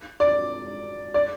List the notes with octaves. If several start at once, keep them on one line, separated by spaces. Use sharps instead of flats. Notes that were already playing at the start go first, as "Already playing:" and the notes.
D5
D5